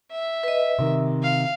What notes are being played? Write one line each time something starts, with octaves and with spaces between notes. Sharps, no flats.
E5
B4 D#5
C3 D#3 C4
F5